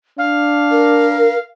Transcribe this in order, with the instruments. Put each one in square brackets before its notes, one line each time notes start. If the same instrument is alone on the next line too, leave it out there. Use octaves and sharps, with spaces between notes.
[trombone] D4 [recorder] F5
[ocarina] A#4